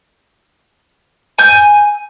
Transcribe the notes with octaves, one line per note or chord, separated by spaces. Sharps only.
G#5 E6 G6